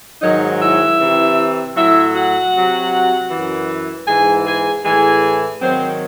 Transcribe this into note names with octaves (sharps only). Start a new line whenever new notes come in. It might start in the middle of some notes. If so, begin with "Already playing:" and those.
G#2 D#3 F#3 D#4 D#5
E4 E5
C3 E3
A2 F#3 E4 E5
F#4 F#5
C3 F#3
F#2 E3
G#2 E3 G#4 G#5
G#4 G#5
A2 E3 G#4 G#5
G#2 D#3 F#3 C4 C5